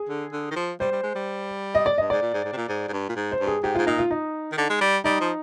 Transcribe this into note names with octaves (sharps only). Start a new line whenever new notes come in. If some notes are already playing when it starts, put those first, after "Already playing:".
Already playing: G#4
D3
D3
D#3
F3
G3 C5
G3
G#3
G3
D#5
D5
G2 D#5
G#2 D5
A#2
G#2
G#2
C3
A#2
G#2
G#2
G2
A#2
G#2
C5
G2
G#4
G#2 G4
G#2 F4
A#2 D#4
F4
D#4
D#3
D3
G#3
G3
G3 D#4
F3